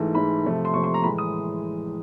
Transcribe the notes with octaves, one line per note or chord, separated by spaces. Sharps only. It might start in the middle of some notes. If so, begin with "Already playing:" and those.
Already playing: G#2 E3 A3
G#2 E3 A3 B5
C3 F3 A3
C6
C3 F3 A3 C#6
C6
A#5
A2 E3 G#3 B5
D#6